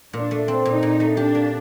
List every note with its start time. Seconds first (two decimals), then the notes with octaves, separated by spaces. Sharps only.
0.13 A#2 D4
0.31 A3
0.48 C4
0.65 A#2 D#4
0.83 A#2
1.00 A3
1.17 D4 G4
1.35 A#3